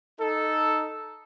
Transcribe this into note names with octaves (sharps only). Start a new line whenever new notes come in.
D#4 A4